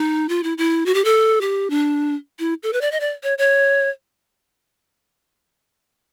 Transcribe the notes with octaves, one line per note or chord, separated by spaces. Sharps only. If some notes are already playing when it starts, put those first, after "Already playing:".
Already playing: D#4
F4
E4
E4
F#4
G4
A4
G4
D4
E4
A4
B4
D5
D#5
D5
C#5
C#5